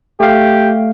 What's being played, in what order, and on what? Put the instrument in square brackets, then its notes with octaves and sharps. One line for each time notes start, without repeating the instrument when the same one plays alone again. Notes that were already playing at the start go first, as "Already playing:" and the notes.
[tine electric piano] A3 F5 [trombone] G4